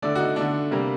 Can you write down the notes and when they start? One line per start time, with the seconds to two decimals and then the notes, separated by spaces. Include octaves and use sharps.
0.02 D3 A3 D4 D5
0.15 F#4
0.19 D#4
0.36 D3 A3 D4
0.71 C3 G3 A#3